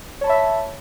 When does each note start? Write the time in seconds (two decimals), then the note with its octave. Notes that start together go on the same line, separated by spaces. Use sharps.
0.21 C#5
0.24 A5
0.27 B5
0.29 E5